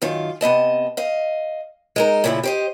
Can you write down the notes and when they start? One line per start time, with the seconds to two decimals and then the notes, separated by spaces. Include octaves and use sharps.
0.02 F#2 D#3 F4
0.41 C3 B3 D#5 A5
0.97 D#5 F5
1.96 G#3 D#4 A#4
2.24 A#2 C#3 F3 A3 E4
2.44 G4 C5 D#5